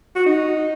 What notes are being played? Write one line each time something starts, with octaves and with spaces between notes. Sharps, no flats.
F#4
D#4